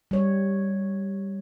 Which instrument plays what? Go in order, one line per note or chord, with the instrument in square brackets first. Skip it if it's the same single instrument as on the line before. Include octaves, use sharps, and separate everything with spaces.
[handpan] G3 C#5